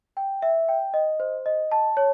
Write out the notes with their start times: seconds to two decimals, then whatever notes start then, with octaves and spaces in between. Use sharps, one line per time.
0.17 G5
0.42 E5
0.69 G5
0.94 D#5
1.20 C5
1.46 D#5
1.72 A5
1.97 C#5